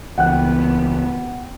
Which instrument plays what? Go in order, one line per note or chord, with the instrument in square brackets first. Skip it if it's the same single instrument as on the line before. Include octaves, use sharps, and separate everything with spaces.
[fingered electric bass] C#2 E3 [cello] B3 [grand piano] F#5 G5 F#6